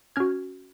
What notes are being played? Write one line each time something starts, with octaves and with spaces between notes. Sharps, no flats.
C#4 F#4 F6 G#6